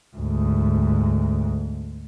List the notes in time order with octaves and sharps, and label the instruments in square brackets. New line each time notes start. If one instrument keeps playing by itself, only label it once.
[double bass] D2 G#2